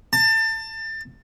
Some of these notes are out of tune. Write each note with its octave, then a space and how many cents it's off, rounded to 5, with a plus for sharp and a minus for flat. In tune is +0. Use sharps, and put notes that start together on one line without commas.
A5 +25